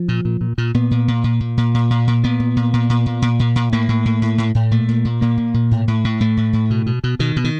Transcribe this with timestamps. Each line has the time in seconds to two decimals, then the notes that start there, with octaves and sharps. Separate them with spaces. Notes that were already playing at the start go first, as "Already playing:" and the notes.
Already playing: F3
0.09 A#2
0.25 A#2
0.41 A#2
0.58 A#2
0.74 A#2 B3
0.91 A#2
1.08 A#2
1.24 A#2
1.40 A#2
1.57 A#2
1.74 A#2
1.90 A#2
2.07 A#2
2.24 A#2 B3
2.40 A#2
2.56 A#2
2.73 A#2
2.90 A#2
3.06 A#2
3.22 A#2
3.40 A#2
3.56 A#2
3.73 A2 A#3
3.89 A2
4.05 A2
4.22 A2
4.38 A2
4.55 A2
4.71 A#2 A3
4.88 A#2
5.05 A#2
5.21 A#2 A#3
5.37 A#2
5.54 A#2
5.71 A2
5.88 A2
6.04 A2
6.20 A2 A3
6.37 A2
6.53 A2
6.70 B2
6.86 B2
7.04 B2
7.19 B2 D#3
7.36 B2
7.44 D#3